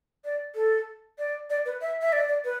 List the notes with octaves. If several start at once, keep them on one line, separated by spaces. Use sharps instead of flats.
D5
A4
D5
D5
B4
E5
E5
D5
D5
B4